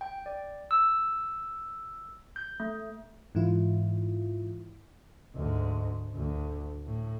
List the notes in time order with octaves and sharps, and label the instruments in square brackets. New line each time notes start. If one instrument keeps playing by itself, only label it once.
[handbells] G5
D5
E6
G6
A3
[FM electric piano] G#2 E3 E4 F4
[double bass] D2 G#2
D2
A2